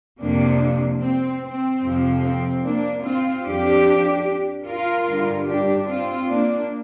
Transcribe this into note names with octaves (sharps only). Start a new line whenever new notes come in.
F2 C3 F3 A#3 D4
C4
C4
F2 C3 F3
C4
A#3 D4
C4 F4
F2 F3 D4 G4
F4 A#4
G2 D3 G3
D4 G4
C4 F4
A#3 D4